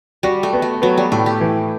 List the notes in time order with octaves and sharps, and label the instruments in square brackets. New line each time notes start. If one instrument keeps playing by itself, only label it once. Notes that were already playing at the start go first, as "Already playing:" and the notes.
[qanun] G3 [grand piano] F#4
[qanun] A3
[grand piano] B3
[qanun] A3
[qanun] F#3 [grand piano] B3
[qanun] G3
[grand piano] A2 [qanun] A3
[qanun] G4
[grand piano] E3